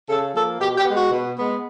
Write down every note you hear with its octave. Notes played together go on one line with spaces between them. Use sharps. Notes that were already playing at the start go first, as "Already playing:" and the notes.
C#3 A4
F3 A#3 A4
B2 G4
G4
B3
G#3 F#4
B2
G#3 B3